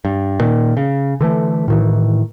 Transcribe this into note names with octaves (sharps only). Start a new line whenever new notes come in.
G2
A#2 D#3
C#3
D3 E3 A3
A2 D#3 E3